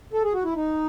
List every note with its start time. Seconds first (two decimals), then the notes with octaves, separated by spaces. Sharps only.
0.13 A4
0.24 G#4
0.34 F#4
0.45 E4
0.56 D#4